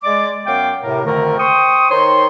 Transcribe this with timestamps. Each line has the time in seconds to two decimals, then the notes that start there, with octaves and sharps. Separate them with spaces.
0.03 G#3 D5 D6
0.45 F#2 B3 F5 G5 D6
0.82 A2 C3 A#4
1.05 F2 D3 D#3 A3 A#4
1.38 C5 G5 C#6 D#6
1.90 D#3 D#4 C5 C#5 C6